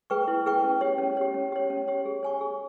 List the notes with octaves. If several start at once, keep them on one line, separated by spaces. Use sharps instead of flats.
G#4 B4 G5 C#6
E4
G#4 B4 G5 C#6
C#4
G4 C#5
C#4
G4 C#5
C#4
G4 C#5
C#4
G4 C#5
G#4
C#5 G#5 C#6
G#4